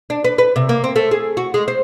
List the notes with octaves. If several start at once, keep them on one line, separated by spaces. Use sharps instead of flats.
D4
B4
B4
C3
A#3
C4
A3
G#4
F#4
G#3
C5